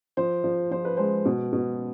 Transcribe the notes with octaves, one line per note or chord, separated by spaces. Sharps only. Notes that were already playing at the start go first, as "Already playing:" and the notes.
F3 C5
F3
F3 C5
B4
G#3 C5
B2
B2